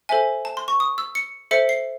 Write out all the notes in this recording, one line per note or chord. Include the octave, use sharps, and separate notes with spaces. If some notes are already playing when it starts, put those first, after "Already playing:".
A4 C5 E5 G#5
A5
C6
C#6
D#6
E6
C#7
A4 C5 E5 C#7
C7